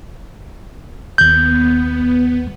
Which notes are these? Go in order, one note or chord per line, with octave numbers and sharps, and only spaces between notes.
D#2 B3 G6